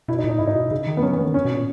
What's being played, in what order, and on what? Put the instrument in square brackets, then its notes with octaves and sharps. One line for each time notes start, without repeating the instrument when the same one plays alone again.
[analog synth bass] B2 [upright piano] E4
[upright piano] D#4
[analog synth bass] A#2
[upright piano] D#4
[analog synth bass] G#2 [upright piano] E4
[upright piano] D#4
[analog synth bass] B2
C#3
D#3
[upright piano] B3
[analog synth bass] F#3 [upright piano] C#4
[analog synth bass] E3
[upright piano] B3
[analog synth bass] D#3
[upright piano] C#4
[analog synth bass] B2
A#2